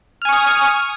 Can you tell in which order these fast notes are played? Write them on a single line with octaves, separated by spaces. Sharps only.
F6 G#5 C#6 D#6